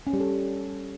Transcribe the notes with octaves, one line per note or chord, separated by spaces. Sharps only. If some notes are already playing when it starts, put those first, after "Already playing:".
C#4
G3
A4